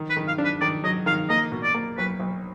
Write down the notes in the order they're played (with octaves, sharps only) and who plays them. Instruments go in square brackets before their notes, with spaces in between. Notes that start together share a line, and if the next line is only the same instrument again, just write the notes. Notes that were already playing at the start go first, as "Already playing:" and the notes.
Already playing: [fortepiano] D#3
[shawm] B4
[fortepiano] D#3
[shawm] F5
[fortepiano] D4
[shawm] B4
[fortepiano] D#3 [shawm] D5
[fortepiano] F#3 [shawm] D#5
[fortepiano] D#3 [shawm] F5
[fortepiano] A#3 [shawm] D#5
[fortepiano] B2
[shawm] D5
[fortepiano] A#3
[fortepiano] B1 [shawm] B4
[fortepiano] B1